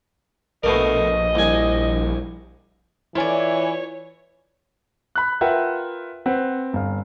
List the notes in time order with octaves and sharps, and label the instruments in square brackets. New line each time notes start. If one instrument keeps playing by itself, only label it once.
[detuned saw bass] A#1 [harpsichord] B2 A3 A#4 [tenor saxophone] D#5
[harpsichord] C2 G#5
[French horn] E3 [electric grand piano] E4 G#5 [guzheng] F4 D5 [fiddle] C#5
[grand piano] B5 F#6
F4 A#4 B4 E5 F#5 G5
C4 B4 F#5
G1 F5